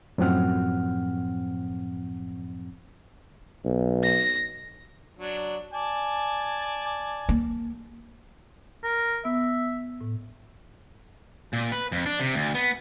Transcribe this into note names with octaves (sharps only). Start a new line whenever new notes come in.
F#2 A2 F3 C4 F#5 F6
B1
A#6
F#3 D4
D5 G#5 A5
A#3
A#4
B3 E5
A2
A#2
B4
F2
D4
C3
D2
B3